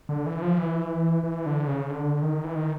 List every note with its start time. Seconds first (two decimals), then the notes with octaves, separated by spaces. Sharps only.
0.09 D3
0.26 E3
0.42 F3
0.58 E3
1.24 E3
1.46 D3
1.67 C#3
1.90 D3
2.22 D#3
2.44 E3
2.55 D#3